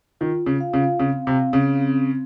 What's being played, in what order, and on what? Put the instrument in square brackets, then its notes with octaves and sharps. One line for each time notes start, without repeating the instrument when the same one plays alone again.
[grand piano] D#3 [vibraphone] F4
[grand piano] C#3
[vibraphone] F5
[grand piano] C#3
[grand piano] C#3 [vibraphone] C4
[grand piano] C3
[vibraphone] C4
[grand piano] C#3
[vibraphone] C4